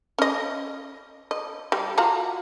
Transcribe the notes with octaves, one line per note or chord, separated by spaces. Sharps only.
C#4 D#5
D#5
G3
F4 F#4 A#5